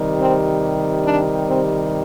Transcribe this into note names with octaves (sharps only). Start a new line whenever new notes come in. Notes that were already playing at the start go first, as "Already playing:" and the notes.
Already playing: C3 D#3 G3
C4
D4
C4